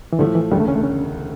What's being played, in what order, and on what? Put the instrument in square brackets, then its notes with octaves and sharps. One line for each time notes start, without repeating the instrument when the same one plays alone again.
[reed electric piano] E3
[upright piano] A2 F3 A3 [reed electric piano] D3
[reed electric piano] E3
[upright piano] E1 D2 C#3 [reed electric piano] G3
[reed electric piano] A3
C#4
A3
C#4